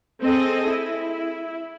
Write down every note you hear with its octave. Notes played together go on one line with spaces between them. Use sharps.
C4 G#4 A4 D#5
E4